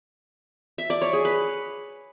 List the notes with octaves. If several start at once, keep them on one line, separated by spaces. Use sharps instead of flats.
E5
D5
C#5
G#4
B4